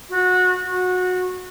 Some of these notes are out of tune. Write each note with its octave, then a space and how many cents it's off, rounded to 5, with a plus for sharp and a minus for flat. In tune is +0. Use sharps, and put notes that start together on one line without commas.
F#4 -20
F#4 -20